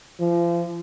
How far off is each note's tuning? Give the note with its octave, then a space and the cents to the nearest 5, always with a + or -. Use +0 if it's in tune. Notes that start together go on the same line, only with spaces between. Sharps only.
F3 -35